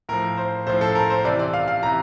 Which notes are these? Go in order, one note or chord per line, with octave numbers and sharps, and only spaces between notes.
A2 F3 A#4
C5
A2 F3 C5
A4
A#4
C5
C3 E3 D5
D5
F5
F5
C3 E3 A#5